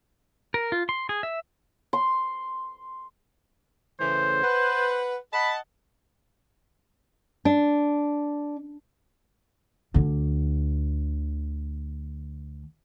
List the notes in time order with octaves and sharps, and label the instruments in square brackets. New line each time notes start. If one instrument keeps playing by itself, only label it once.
[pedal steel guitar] A#4
F4
C6
G#4
E5
[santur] C6
[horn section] A2 C#3 E3 [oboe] C5
[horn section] B4 F#5
[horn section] D#5 F#5 A5 [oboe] B5
[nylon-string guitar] D4
[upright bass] D2 D3